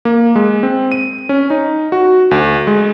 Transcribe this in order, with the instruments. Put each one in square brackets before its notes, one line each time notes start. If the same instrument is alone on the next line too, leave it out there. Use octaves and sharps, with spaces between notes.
[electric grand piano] A#3
G#3
C4
D#7
C#4
D#4
F#4
D2
G#3